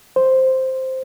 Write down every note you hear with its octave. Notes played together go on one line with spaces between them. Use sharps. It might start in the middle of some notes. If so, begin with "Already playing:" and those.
C5